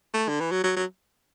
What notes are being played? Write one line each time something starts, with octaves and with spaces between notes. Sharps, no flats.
A3
D3
E3
F#3
F#3
F#3